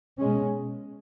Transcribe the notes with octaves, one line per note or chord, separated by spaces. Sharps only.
B2 G#3 C#4